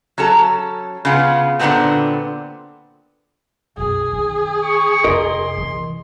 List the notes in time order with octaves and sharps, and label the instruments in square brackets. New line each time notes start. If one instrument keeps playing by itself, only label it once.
[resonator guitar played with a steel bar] F#3 C#4 A4 A#5
C#3 B3 F4 B4
A#2 D3 E3 A3 B3 C4
[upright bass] B1 F#2 [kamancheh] G#4
[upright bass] D#3
[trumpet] C#6
[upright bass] F2 C3 [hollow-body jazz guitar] A#4 D#5 [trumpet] C6
[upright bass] E3